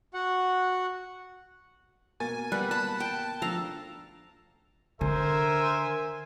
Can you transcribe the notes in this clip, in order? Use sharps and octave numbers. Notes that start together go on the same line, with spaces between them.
F#4 F#5
B2 A#3 G#5 A6
G3 B4 F#5
A5 B5
G5
F3 A3 D4 A4 F5 A#5
D3 A#4 C5 E5 G#5